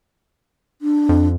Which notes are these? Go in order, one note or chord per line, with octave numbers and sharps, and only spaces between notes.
D4
F2